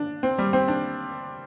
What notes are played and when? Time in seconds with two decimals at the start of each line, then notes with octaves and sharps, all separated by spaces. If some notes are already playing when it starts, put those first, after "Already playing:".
Already playing: D4
0.23 C4
0.38 G3
0.53 C4
0.68 D4